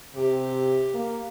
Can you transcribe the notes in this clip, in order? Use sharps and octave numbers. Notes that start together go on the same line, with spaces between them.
C3 G4
A#3